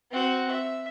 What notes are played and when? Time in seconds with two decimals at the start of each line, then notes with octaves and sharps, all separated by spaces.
0.12 C4 F#4
0.51 E5